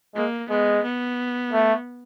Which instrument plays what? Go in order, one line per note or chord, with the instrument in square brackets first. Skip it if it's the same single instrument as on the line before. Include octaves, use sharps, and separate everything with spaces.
[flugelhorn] G#3 [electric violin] A#3
[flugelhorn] G#3 [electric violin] B3
[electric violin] B3
[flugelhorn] A3